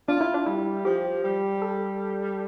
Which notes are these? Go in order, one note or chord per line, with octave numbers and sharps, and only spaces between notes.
D4 F4
E4
D4
G3 E4
F3 G4
G3
A4